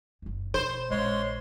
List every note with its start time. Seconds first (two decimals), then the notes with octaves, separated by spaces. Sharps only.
0.22 F#1 D#2
0.54 B2 C5
0.91 A#1 G#3 C#5 C6